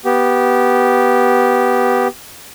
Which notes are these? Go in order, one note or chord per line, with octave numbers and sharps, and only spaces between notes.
B3 G4